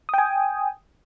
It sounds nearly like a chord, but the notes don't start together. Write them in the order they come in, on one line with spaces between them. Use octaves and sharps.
D#6 G5 G#5